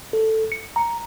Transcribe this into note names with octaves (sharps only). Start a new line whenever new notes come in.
A4
C#7
A#5